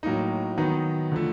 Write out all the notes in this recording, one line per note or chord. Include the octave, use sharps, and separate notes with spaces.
A2 F#3 A#3 D#4
D#3 F#3 B3 D#4
D3 F3 A3